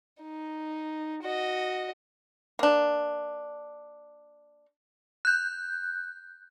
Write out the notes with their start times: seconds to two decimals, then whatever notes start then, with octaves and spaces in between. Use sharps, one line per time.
0.22 D#4
1.22 F#4 D#5
2.59 A#3 D4
5.25 F#6 G6